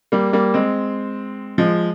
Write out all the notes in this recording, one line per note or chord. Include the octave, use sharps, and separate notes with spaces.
G3 A#3
G3 A#3
G#3 C4
F3 G#3